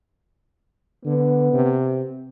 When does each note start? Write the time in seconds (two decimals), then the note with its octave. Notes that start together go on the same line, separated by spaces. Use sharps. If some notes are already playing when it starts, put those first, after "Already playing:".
1.05 D3 B3
1.53 C3